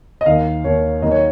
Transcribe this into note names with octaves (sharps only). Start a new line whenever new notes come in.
D#5
D#2 D#3 A#3 F5
D#2 D#3 A#3 C#5
D#2 D#3 F#3 A#3 D#4 D#5
C#5